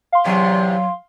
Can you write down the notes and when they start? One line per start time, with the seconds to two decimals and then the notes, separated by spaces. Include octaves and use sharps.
0.12 F5 C6
0.25 E2 C3 F#3